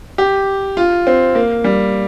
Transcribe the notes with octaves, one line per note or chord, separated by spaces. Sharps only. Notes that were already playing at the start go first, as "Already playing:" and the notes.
G4
F4
C4
A#3
G3